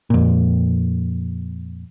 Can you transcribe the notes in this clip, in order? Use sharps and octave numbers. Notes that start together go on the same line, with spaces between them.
F2 A#2